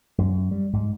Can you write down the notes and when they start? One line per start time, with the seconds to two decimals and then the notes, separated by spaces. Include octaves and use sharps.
0.18 F#2
0.51 G3
0.73 G#2